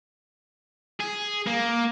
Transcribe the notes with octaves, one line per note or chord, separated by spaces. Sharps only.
G#4
A#3